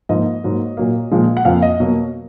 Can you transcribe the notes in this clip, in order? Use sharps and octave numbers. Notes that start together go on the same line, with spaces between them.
G#2 F3 A#3 D#5
G#2 F#3 A#3
A#2 F#3 A#3
A#2 F3 G#3
F#5
F2 F3 A#3 F5
D#5
B2 F#3 A#3